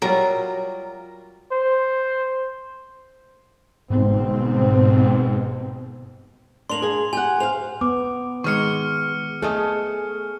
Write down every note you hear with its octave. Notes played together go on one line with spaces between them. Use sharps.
F#3 G3 F4 A#4 A#5
C5
G1 G#2 B2 C4
A#3 D4 C6 F7 F#7
A#3 G#4
G4 F#5 G#5
C5 F5 F7
B3 D6
D#3 G#3 C#6 F6 C#7
A3 G#4 A4 D#5